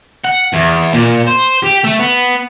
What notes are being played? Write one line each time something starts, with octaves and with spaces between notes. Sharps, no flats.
F#5
E2
A#2
C5
G4
A3
B3